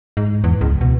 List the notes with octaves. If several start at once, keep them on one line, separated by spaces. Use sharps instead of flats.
G#2
E2
C#2
B2